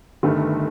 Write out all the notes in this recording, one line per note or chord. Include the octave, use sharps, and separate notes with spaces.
G1 G2 D#3 A3